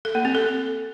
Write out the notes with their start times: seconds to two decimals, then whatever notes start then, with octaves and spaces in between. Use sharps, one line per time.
0.05 A4
0.15 A#3
0.25 C4
0.35 A4